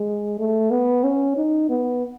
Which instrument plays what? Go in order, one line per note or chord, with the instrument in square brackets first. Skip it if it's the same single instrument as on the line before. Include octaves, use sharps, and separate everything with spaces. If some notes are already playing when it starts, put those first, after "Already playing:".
Already playing: [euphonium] G#3
A3
B3
C#4
D#4
B3